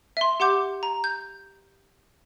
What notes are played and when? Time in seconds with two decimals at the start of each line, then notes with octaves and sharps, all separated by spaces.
0.17 E5 C6
0.40 G4 F#5 C6 D6 G6
0.83 A#5
1.04 G6